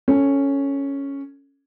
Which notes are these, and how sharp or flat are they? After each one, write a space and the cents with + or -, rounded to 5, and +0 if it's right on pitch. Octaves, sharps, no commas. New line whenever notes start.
C#4 +0 A4 +15